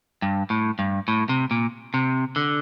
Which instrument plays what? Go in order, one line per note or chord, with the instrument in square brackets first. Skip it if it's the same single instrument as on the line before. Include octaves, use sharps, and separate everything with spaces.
[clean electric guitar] G2
A2
G2
A2
C3
A#2
C3
D3